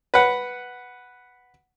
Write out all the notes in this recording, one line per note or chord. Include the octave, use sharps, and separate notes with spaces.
B4 F#5